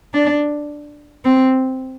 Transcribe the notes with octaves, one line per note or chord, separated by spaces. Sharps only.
D4
C4